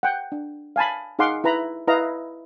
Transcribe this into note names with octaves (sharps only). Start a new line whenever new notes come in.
F#5 G5
D4
F5 G#5 A5 B5
D#4 G#4 F5 F#5 C6 D6
E4 B4 A#5 B5
E4 B4 D#5 F5 A#5